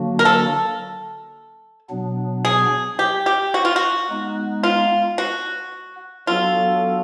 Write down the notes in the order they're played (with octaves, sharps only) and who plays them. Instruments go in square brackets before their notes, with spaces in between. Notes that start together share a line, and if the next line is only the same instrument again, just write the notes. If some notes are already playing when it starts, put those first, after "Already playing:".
Already playing: [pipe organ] D3 F#3 A#3 D4 F#4
[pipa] A#4
A4
[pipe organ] B2 F#3 B3 D4
[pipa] G#4
G4
G4
F#4
F4
F#4
[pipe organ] G#3 B3 D#4
[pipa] F4
F#4
[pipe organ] F#3 B3 D4 F#4 A4 [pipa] F4